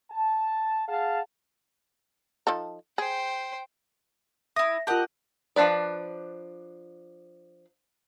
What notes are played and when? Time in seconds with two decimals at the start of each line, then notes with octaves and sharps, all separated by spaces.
0.11 A5
0.88 G#4 F5 F#5 A5
2.47 F3 D#4 A4
2.98 G#4 C5 G5
4.56 E4 E5 D#6 A#6
4.87 F4 G4 A#4 D#5 F#5 A5
5.56 F3 B3 D4 B4 D5